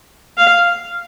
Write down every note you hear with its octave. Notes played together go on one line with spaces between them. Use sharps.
F5